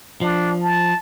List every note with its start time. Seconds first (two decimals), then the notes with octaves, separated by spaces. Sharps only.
0.21 F3 D4
0.61 A5